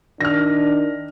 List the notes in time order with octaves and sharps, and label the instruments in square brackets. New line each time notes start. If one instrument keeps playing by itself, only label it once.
[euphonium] D#3 [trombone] D4 [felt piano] F6 A#6